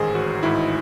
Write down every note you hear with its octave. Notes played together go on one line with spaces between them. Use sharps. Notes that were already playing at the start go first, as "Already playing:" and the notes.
Already playing: A1 G#2 D#3 G#4 C5
A1 F#4
G#2 D#3 E4